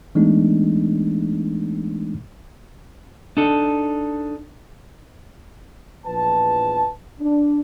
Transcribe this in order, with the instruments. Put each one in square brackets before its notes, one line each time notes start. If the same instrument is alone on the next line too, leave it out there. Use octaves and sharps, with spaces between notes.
[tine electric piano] E3 G#3 A3 B3 D4 D#4
[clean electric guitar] D4 D#4 A4
[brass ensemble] A#1 E2 F3 B4 A5
D4